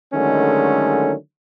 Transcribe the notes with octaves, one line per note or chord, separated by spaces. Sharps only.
D3 D#3 F#3 G#3 A3 C#4